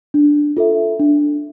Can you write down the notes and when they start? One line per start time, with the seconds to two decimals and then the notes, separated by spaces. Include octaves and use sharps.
0.14 D4
0.57 F4 A4 E5
1.00 D4